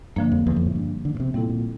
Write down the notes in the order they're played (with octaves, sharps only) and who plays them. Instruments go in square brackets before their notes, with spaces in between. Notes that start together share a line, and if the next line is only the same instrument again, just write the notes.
[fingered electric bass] G2 [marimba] D3 F3 A#3
[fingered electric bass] F2
E2
F2
A2
G2
D3
A#2
C3
[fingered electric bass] A#2 [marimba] G3 C4 E4 A4
[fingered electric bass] A#2